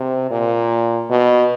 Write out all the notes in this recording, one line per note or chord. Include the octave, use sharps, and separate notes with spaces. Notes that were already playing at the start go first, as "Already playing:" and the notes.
Already playing: C3
A#2
B2